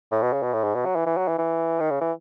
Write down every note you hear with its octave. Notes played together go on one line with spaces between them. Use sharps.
A2
B2
C#3
B2
A2
G#2
B2
F#3
E3
E3
F#3
E3
E3
D#3
C#3
E3